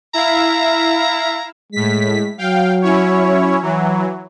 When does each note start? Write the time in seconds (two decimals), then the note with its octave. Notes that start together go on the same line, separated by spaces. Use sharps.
0.14 E4 E5 F5 A#5
1.72 A2 G#3 B6
2.38 F#3 F5 G5
2.82 C#4 E4 C#5
3.62 E3 F#3